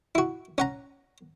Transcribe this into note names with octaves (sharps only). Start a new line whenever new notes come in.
E4 F#4
C#4 F#5 A#5